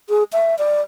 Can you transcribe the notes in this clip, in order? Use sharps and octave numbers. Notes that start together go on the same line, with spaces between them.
G#4
E5
D5